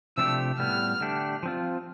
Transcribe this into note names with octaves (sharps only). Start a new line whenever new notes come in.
C3 F3 A3 D4 G4 E6
A2 G3 B3 F6
D3 A3 D4 G4
F3 C4 F4